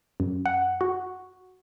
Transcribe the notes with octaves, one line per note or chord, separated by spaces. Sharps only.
F#2
F#5
F#4